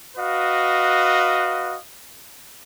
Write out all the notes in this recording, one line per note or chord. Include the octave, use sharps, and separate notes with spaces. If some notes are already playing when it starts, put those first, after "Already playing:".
F#4 B4 D#5 F5